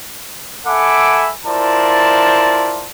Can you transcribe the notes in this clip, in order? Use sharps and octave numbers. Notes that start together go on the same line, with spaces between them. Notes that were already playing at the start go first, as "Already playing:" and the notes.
A4 E5 F#5 G#5 B5 D6
E4 F4 A#4 C5 D5 A5